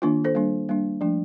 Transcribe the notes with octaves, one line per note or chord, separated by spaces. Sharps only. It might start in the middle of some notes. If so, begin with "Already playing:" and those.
D#3 A#3 D4 F4
A4 C5
G3 A#3 D4
G3 A#3 D4
F3 A3 D4